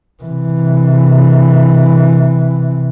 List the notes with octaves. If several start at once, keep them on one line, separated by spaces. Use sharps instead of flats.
C3 E3